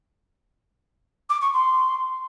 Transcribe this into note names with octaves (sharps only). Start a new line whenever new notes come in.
D6
C#6
C6